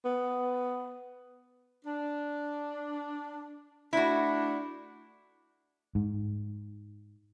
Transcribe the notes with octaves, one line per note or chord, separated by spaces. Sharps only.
B3
D4
A3 D4 E4 F#4
G#2